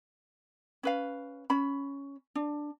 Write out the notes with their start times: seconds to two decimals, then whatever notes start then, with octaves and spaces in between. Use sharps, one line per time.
0.83 C#4 B4 F5
1.50 C#4 B5
2.35 D4